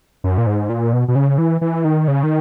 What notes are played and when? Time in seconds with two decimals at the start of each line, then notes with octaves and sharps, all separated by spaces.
0.24 F#2
0.38 A#2
0.47 G#2
0.69 A#2
0.93 B2
1.08 B2
1.15 C#3
1.38 E3
1.61 E3
1.85 D#3
2.08 C#3
2.23 D#3